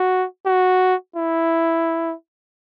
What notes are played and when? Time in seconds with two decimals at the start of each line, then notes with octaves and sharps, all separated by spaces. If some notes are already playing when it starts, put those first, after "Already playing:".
Already playing: F#4
0.46 F#4
1.16 E4